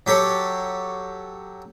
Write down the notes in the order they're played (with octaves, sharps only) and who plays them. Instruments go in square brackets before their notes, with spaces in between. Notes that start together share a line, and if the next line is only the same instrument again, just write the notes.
[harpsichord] F#3 G4 A4 C#5